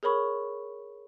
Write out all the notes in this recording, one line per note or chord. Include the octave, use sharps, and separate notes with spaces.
G#4 A#4 C#5 B5 C#6